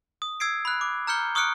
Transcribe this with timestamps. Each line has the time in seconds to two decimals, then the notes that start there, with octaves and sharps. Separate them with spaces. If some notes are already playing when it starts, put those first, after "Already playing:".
0.22 D#6
0.40 E6 G#6 C7 D7
0.65 B5 F#6
0.81 D6
1.07 A#5 F6 G6 C#7 G7
1.35 C#6 D#6 F6 F#6 C#7 D7